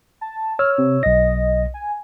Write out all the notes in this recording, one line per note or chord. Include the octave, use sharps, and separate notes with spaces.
A5
C#5 E6 F6
C3
B1 D#5 A#6
G#5